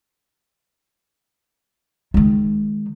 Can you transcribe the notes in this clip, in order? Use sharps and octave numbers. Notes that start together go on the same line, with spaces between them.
D#3 G#3